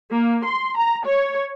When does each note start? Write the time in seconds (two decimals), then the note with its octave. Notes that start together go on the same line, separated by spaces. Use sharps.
0.11 A#3
0.43 C6
0.77 A#5
1.05 C#5